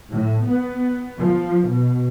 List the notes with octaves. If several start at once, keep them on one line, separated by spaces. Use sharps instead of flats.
A2
B3
F3
B2